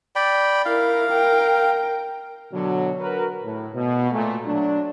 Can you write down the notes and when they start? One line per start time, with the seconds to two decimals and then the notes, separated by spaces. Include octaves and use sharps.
0.16 D5 G5 B5
0.65 E4 A#4 F5
1.10 A#4 G5
2.53 B2 D3 F#3
3.00 F#4 A#4 B4
3.43 A2
3.75 B2
4.12 A#2 A3
4.46 F#3 D4